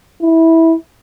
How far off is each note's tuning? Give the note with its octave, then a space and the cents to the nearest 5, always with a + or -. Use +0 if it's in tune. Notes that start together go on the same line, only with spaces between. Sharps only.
E4 -15